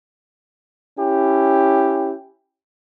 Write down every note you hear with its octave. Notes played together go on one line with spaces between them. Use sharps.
C#4 E4 G4